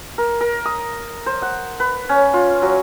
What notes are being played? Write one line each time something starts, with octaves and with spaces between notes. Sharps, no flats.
A#4
A#4
D#6
C5
F#5
B4
C#4
F4
F#3